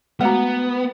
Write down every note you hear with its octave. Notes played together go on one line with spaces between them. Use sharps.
G#3 A3 B3 F#4 F#5 A#5